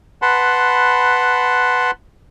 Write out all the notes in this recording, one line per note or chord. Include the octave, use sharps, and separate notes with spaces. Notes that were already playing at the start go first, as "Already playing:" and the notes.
B4 F#5 A5 B5 C6